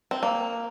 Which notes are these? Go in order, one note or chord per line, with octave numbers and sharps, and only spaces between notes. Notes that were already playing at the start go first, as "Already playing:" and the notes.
C4
A#3